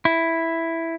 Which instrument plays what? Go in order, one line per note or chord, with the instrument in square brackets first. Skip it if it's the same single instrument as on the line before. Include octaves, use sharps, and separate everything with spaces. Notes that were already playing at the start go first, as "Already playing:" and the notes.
[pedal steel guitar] E4